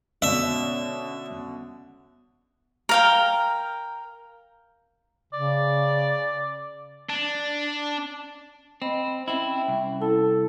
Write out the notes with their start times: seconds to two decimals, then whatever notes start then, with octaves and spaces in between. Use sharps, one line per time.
0.22 B2 D3 C#4 E5
2.89 A#4 F5 G5
5.33 C#3 D5
7.09 D4
8.82 C4 D#5 B5
9.28 C4 C#4 E4 E5 G5
9.68 C2
10.02 E4 A4